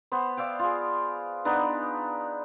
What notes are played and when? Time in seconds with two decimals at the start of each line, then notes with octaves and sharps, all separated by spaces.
0.12 B3 C5
0.37 D5 E5 F5 G5
0.59 F4 G#4
1.45 B3 D4 D#4 B4